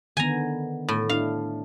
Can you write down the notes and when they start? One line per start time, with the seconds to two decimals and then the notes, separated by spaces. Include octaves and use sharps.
0.17 D3 D#3 B3 G#5 A#5
0.88 A2
1.09 D4 E4 F5